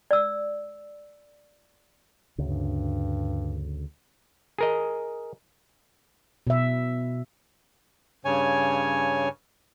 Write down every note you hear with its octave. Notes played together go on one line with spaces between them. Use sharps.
D5 E6
D2 G2 C#3
G#4 A#4 D#5
B2 E5
G2 C#3 C#5 G#5